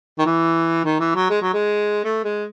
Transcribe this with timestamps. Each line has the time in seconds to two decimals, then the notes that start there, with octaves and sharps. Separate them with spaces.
0.18 D#3
0.25 E3
0.84 D#3
0.99 E3
1.15 F#3
1.29 G#3
1.42 F#3
1.53 G#3
2.04 A3
2.24 G#3